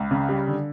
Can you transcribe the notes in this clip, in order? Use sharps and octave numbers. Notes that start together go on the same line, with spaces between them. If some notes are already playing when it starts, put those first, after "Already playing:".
Already playing: C#2
C#3
G3
D3